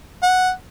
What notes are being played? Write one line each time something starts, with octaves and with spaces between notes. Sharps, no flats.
F#5